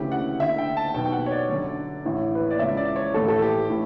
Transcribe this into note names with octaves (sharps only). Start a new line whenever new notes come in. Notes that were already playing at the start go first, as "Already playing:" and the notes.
Already playing: D2 C#3 E3 G4
F#5
D2 D3 E5
G5
A5
B1 B2 G5
G5
F#5
C#5
D5
G1 F#2 D3
A1 A2 E3
B4
C#5
D5
C#2 C#3 E3 E5
D5
C#5
A1 A2 E3 A4
A4
G4
A2 E3